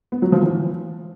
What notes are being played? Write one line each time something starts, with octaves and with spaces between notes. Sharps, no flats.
B3
F#3
F3
E3